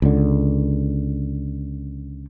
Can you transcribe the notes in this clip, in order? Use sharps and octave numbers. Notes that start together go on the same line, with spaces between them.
C#2 D3